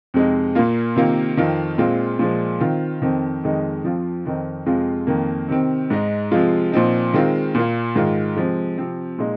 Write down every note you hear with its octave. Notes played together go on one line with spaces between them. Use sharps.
F2 C3 G#3 D#4
A#2 A#3 F4
C3 D#3 A#3 F4
F2 D#3 C4 F4
A#2 G#3 C4 F4
A#2 F3 G#3
D#3 C4 F4
F2 D#3 C4
F2 D#3 G#3 D#4
F2 F3 C4 F4
F2 D#3 C4 D#4
F2 C3 G#3 F4
F2 D#3 A#3
C3 D#3 C4
G#2 G#3 D#4
C3 F3 G#3 F4
A#2 F3 C4 D#4
D#3 G#3 C4 F4
A#2 A#3 F4
G#2 D#3 G#3 F4
C3 F3 G#3
C3 F3 C4
A#2 G#3 D#4